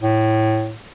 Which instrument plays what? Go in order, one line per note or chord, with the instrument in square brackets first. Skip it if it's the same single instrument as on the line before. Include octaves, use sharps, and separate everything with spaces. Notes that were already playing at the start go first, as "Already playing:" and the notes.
[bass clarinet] A2